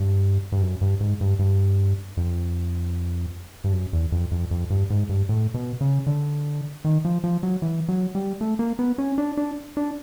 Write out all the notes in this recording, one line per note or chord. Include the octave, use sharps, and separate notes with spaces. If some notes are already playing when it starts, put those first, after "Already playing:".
Already playing: G2
G2
F#2
G2
G#2
G2
G2
F2
G2
F#2
E2
F2
F2
F2
G2
G#2
G2
A2
B2
C#3
D3
D#3
F3
F3
F#3
E3
F#3
G3
A3
A#3
B3
C#4
D4
D4
D4